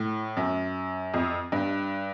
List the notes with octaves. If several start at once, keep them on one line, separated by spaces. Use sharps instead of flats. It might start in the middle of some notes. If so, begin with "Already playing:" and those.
Already playing: A2
F#2
F2
G2